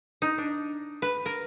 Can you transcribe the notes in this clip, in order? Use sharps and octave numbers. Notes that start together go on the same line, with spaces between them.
D#4
D4
B4
A#4